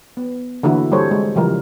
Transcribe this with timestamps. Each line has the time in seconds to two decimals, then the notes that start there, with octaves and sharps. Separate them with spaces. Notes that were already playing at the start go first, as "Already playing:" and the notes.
0.17 B3
0.63 D3 E3 A#3 E4 F#4
0.92 G3 C4 A4 C5 C#5
1.11 G#3
1.36 C#3 E3 F3 G3 A#4